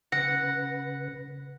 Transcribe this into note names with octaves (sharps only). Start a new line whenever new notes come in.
C#3 B4 F#5 A#6